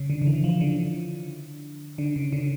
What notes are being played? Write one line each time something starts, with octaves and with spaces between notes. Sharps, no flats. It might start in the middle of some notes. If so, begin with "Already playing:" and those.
Already playing: C#3
D3
D3
E3
F3
D3
D3
C#3
D3